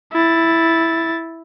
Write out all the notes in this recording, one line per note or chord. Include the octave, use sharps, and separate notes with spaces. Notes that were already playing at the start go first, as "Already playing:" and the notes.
E4 A6